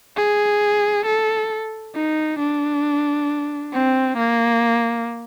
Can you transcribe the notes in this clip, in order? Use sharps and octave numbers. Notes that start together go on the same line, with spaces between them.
G#4
A4
D#4
D4
C4
A#3